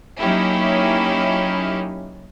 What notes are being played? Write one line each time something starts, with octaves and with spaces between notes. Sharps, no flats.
F#3 A#3 C#4 D#4 E4 G4